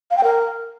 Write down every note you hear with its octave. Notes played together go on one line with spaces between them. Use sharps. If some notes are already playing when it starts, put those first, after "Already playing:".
F5
G5
A#4